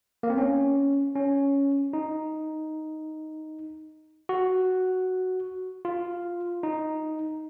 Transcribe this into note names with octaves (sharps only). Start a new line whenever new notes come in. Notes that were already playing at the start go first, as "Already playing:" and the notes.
A#3
C4
C#4
C#4
D#4
F#4
F4
D#4